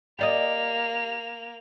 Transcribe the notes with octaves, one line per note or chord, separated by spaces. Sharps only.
A#3 G4 D5 D#5 F7